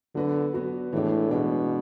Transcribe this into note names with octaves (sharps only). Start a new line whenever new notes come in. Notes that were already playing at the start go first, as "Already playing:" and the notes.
D3 F#3 B3 F#4 B4
F#3 B3 F#4 B4
A2 E3 G#3 D4
B2 E3 G#3 D4